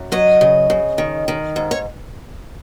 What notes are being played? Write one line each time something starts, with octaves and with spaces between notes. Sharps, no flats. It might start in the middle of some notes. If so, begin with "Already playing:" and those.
Already playing: F#2
F#3 D#5
C#3
C#3
D#3
D#3
G#2
C#5